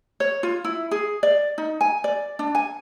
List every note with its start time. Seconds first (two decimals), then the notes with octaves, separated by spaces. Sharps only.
0.20 C#5
0.43 F4
0.64 E4
0.91 G#4
1.23 D5
1.58 D#4
1.81 G#5
2.04 D5
2.39 D4
2.55 G#5